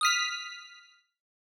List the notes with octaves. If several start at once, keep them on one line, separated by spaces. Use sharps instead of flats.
D#6 F6 B6